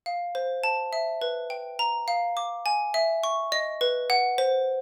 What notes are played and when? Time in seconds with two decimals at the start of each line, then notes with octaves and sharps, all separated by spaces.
0.06 F5
0.35 C5
0.64 A5
0.93 E5
1.22 B4
1.50 G5
1.79 A#5
2.08 F5
2.37 D6
2.66 G#5
2.94 E5
3.23 C#6
3.52 D#5
3.81 B4
4.10 F#5
4.38 C5